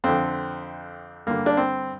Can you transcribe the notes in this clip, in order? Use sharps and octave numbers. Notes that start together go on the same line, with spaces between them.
F2 D3 C4
G2 D3 A#3
D4
C4